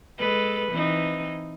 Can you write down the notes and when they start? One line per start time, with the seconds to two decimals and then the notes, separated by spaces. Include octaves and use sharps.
0.18 G#3 A4 B4
0.72 E3 C4 D#4